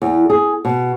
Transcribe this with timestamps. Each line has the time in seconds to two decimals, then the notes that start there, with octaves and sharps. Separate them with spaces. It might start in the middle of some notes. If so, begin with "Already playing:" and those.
0.02 E2
0.30 G#4
0.65 B2